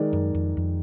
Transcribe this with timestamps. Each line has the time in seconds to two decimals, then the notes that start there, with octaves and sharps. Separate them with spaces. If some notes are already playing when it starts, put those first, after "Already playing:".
Already playing: D#3 G#3 D#4 A#4 D5
0.13 F#2
0.35 F2
0.57 F2